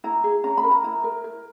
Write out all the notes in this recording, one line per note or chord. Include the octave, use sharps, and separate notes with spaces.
E4 A#5
G#4
C#4 A#5
B5
A#4
A#5
E4 A#5
A#4
A#4